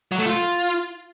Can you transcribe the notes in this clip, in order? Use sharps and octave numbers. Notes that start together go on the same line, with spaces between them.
F#3
A3
F4